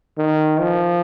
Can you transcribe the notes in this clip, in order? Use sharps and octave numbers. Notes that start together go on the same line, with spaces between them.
D#3
F3